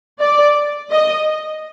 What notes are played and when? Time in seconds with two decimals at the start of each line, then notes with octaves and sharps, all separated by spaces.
0.19 D5
0.91 D#5